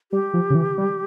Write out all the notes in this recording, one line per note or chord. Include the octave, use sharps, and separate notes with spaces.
G3 G4
F3
C#3
E3
G3